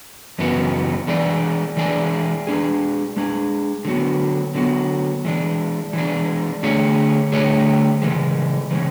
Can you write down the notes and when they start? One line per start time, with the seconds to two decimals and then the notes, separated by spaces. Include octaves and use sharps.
0.38 F#2 C#3 E3 B3 F#4
1.07 E3 G#3 D4 G#4 D5
1.77 E3 G#3 D4 G#4 D5
2.47 G#3 D4 G#4
3.16 G#3 D4 G#4
3.85 D3 F#3 B3 F#4
4.55 D3 F#3 B3 F#4
5.25 E3 G#3 D4
5.93 E3 G#3 D4
6.63 D3 A3 D4 G#4 C#5
7.32 D3 A3 D4 G#4 C#5
8.02 C#3 E3 G#3
8.71 C#3 E3 G#3